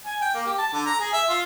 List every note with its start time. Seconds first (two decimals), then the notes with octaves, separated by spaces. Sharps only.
0.06 G#5
0.21 G5
0.34 A#3
0.46 G4
0.58 A5
0.73 D3
0.86 A#5
1.00 G#4
1.13 E5
1.29 F4